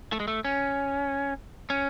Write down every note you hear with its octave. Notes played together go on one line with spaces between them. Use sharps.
A3
G#3
A3
C#4
C#4